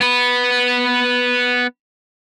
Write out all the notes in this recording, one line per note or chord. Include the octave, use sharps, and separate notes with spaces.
B3 B4